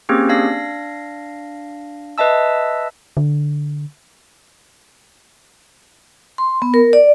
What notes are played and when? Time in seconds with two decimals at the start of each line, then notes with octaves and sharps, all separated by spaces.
0.09 A#3 C4 C#4 G4 G#4
0.29 D4 F5 A#6
2.18 B4 D#5 E5 A5 E6
3.17 D3
6.38 C6
6.62 B3
6.74 A#4
6.93 D5